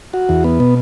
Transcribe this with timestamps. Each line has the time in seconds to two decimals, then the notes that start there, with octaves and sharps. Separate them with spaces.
0.13 F#4
0.29 E2
0.44 B3
0.60 B2